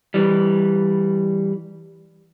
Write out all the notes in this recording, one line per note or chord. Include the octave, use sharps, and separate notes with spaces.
E3 G3